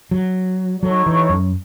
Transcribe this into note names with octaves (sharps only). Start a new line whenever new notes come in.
F#3
F#3 D#4 A4 C#5
E3
F#2